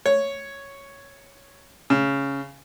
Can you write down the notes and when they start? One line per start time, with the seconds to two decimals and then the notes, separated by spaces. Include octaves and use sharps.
0.06 C#5
1.90 C#3